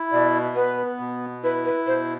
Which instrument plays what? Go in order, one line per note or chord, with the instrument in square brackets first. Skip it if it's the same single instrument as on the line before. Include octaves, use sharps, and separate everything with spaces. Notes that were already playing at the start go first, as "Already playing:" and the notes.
Already playing: [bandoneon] E4
[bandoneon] B2 [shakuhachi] D5
[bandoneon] B3 [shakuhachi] B4
[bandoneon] B2
[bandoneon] E4 [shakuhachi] B4
[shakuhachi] B4
[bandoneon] B2 [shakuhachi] C5